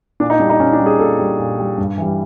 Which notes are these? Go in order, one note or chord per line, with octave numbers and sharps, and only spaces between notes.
A#2 D4
D#4
G3 D4
D#4
A#2 C#4
D4
G3
G#4
A#2 A4
G3
A#2
G3
G2
E3 G3